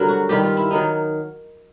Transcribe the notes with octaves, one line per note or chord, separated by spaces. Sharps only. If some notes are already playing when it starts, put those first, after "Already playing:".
Already playing: G2 D3 F#3 A#4
F#4
G2 D#3 G3 G4
F4
E4
D#3 F#3 D#4